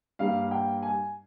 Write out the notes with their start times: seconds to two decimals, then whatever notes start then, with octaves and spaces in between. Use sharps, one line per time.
0.19 G2 G3 A#3 F5
0.51 G5
0.83 G#5